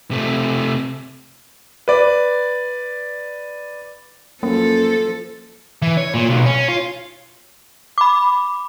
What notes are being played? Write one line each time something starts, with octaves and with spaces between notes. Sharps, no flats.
C3 A3
B4 D5
F#2 F3 A#3 A4
E3
C#5
A#2
B1
C#4
F4
B5 D6